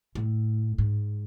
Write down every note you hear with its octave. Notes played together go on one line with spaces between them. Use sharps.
A2
G#2